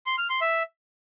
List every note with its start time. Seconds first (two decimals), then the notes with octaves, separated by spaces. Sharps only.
0.06 C6
0.18 F6
0.30 C6
0.41 E5